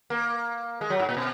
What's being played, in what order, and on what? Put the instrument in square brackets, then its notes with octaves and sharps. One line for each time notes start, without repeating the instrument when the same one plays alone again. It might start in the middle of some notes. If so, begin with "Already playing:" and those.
[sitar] A#3
G#3
F#3
G#2
A#2
B2